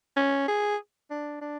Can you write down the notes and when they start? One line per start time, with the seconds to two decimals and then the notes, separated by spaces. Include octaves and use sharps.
0.16 C#4
0.48 G#4
1.10 D4
1.41 D4